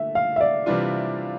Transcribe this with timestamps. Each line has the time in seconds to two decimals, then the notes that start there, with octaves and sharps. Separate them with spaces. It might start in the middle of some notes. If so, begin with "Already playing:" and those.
Already playing: D3 A3 E5
0.15 F5
0.36 E5
0.41 D5
0.66 C3 E3 G3 D4 F4